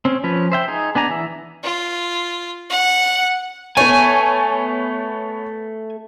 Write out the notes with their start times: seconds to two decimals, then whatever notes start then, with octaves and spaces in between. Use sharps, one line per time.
0.05 C4 C#4
0.24 F3 C#4 B4
0.52 C5 E5 G5
0.68 D#4 G#4
0.95 B3 D4 G#5 A#5
1.10 E3 E5
1.63 F4
2.70 F#5
3.77 A3 B3 C#5 G#5